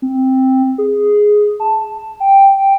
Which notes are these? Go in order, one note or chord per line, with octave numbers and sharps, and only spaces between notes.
C4
G#4
A5
G5